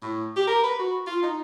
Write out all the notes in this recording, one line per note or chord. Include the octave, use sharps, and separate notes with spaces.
A2
G4
A#4
B4
F#4
F4
D#4